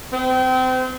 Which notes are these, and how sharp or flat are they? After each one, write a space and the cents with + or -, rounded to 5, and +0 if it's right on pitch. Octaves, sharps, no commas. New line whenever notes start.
C4 -30